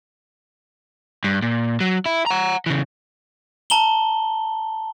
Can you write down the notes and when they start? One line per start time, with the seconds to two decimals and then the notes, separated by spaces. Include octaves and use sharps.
1.24 G2
1.42 A#2
1.80 F#3
2.06 E4
2.26 F#5 A#5
2.66 C#3 E3
3.70 A5 A#5 F#7 G7